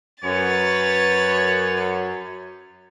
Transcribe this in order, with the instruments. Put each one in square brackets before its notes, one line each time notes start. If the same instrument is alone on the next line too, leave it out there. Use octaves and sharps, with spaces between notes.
[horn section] F#2 [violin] B4 A6 [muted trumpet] C#5